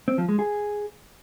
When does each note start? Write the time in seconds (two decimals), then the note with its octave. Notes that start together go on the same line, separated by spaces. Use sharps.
0.08 C4
0.18 F3
0.28 G#3
0.39 G#4